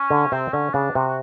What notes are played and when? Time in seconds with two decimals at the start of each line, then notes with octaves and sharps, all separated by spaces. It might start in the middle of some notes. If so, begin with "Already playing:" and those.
Already playing: C#4
0.10 D3
0.32 C3 C4
0.52 D3 C#4
0.74 C#3 D4
0.95 C3 F#4
1.07 F#4